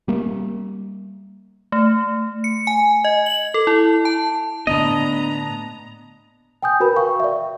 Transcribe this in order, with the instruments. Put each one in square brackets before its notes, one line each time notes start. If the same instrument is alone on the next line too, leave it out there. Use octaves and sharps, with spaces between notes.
[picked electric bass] G3 A#3
[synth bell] A3
C#7
G#5
D#5
F#7
A4
E4
A5
[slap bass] A2 D3 A#3 [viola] B3 A#5 [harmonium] D4 [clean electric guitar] D#5
[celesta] G5 G#5 D#6 G6
F#4 A#4 B4 B5
F5 G5 C#6
D5 E5